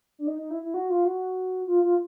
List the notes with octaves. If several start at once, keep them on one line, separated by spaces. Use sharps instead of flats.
D4
D#4
D#4
E4
E4
F#4
F4
F#4
F4
F4